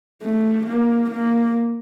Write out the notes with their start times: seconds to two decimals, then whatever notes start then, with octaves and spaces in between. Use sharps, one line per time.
0.23 A3
0.67 A#3
1.11 A#3